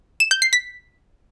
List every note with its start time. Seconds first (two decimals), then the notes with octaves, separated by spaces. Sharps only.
0.20 E7
0.31 G6
0.42 C7
0.53 B6